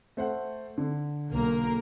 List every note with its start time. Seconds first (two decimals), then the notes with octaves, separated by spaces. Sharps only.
0.17 A3 C5 F#5
0.78 D3
1.30 B1 A#3 A#4